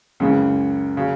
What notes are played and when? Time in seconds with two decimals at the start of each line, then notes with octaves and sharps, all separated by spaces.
0.20 C#2 F#2 C#3 E3
0.97 C#3 F#3